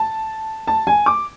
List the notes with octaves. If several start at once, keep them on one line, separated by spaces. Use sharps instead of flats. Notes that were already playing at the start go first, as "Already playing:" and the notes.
Already playing: A5
A5
G#5
D6